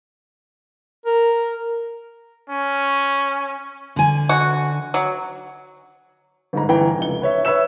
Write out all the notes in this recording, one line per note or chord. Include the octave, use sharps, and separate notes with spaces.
A#4
C#4
D3 G#5
F#4
F#3
G1 G#2 A#5
G1 E3 G5 A#5
F1 C#2 G7
B4 C#5 E5
B4 C#5 E5 E6 E7